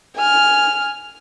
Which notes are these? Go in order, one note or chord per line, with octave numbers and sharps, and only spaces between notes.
G#5 F6